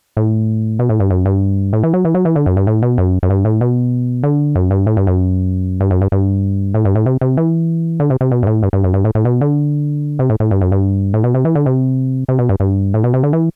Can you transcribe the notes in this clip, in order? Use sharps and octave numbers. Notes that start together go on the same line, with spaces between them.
A2
B2
A2
G2
F#2
G2
A2
E3
F#3
E3
F#3
E3
D3
F#2
G2
A2
B2
F#2
F#2
G2
A2
B2
D3
F#2
G2
A2
G2
F#2
G2
F#2
G2
G2
A2
G2
A2
C3
C3
E3
D3
C3
C3
B2
G2
A2
G2
G2
F#2
G2
A2
A2
B2
D3
C3
A2
A2
G2
F#2
G2
A2
B2
C3
E3
D3
C3
C3
B2
G2
G2
A2
B2
C3
D3
E3